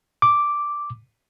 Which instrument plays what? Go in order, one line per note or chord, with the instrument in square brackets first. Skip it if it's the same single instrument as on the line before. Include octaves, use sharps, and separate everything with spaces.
[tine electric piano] D6